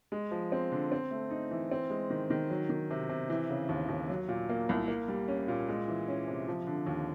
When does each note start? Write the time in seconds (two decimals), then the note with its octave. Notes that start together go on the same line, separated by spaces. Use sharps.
0.12 G#3
0.31 F3
0.52 C4
0.72 D3
0.92 C4
1.11 A3
1.30 D#4
1.51 E3
1.71 C4
1.90 G#3
2.10 D#3
2.30 D#3
2.50 F#3
2.70 D#3
2.91 C3
3.09 C3
3.29 E3
3.50 C#3
3.69 D#2
3.89 D#2
4.10 F#3
4.28 A#2
4.49 A#3
4.69 C2
4.88 A#3
5.08 G3
5.28 C#4
5.48 A#2
5.69 G#3
5.88 E3
6.08 C#4
6.28 C3
6.48 F3
6.67 D3
6.87 D#2